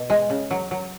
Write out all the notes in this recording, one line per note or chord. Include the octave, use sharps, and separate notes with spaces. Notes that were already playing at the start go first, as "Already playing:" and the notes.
Already playing: B2
G#3
C#3
F#3
F#3